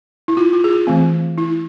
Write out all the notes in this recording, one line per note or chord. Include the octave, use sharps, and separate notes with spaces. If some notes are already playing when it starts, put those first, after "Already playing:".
E4
F4
F4
G#4
F4
E3 A3 C4
E4